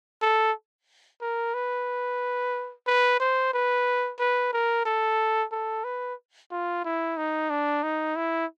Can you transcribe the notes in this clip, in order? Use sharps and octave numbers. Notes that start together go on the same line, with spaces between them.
A4
A#4
B4
B4
C5
B4
B4
A#4
A4
A4
B4
F4
E4
D#4
D4
D#4
E4